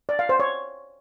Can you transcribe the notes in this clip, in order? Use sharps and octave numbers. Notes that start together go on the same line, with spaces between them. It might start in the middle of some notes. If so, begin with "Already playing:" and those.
D5
F5
C5
C#5